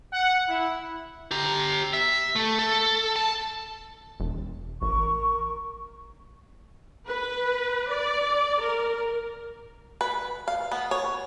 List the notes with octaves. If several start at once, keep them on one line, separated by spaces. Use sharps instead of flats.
F#5
E4
G4 A#5
E5
A3
A4
A5
E1
A1 A#4 C#6
B4
D5
A#4
B4
F5
B3
C#5